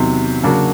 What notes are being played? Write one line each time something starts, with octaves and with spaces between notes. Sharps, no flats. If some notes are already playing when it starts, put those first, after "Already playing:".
Already playing: E2 C3 D#3 F#3
C#3 F#3 A#3 D4 F#4